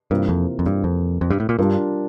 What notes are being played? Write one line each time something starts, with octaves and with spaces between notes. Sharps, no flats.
G2 C3 E3 A#3 F4 A#4
F2
F2
G2
F2
F2
G2
A2
A#2
G2 G3 D4 F4 A#4